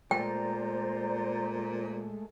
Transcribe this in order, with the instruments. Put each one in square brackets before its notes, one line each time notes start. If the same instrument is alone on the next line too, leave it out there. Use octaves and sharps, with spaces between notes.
[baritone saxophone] A#2 [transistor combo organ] G#3 A3 [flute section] C5 D5 A#5 [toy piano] G5